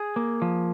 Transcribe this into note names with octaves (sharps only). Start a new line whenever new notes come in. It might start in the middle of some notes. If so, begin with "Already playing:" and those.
Already playing: G#4
A#3
F3